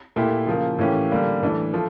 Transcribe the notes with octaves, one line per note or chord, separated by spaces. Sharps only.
A#2 A3 E4 G4
C#3 F3 A#3
A2 E3 A#3 C#4 G4
D3 G3 A#3
A2 E3 A3 D4
F3 A3